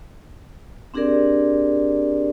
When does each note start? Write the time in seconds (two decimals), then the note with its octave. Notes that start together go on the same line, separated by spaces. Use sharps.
0.94 C4 D4 G4 G#4 A#4 D5